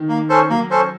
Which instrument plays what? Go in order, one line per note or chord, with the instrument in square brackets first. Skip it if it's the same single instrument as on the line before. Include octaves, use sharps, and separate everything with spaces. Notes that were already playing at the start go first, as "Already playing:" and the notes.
Already playing: [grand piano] D#3
[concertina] A#3
C#4 A4 C5
[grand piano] F#3 [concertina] A#3
[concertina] C#4 A4 C5